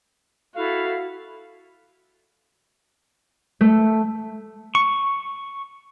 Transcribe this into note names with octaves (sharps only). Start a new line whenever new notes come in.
E4 F#4 A4 F5
A3
C#6